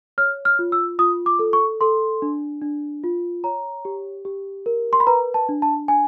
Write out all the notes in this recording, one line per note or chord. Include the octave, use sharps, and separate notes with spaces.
C#5 F6
F6
F4
E6
F4 D#6
D6
A4
C#6
A4 C6
D4
D4
F4
C#5 A#5
G4
G4
A#4
C6
B5
B4 A#5
A5
D4
A5
D4 G#5